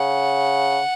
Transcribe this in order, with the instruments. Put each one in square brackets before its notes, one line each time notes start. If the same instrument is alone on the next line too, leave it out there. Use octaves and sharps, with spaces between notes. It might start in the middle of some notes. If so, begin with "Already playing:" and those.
Already playing: [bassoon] C#3 [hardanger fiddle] F#5